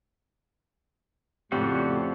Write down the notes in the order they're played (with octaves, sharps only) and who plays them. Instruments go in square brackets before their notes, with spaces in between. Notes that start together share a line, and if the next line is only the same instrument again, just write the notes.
[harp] F2 D4 [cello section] A2 [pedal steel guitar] C#3 C4 F#4 [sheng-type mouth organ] G4